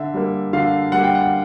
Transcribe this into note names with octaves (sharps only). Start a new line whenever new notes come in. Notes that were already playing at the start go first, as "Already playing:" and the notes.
Already playing: D3 E5
G3 A#3
D3 F5
G3 A#3 F#5
G5
F#5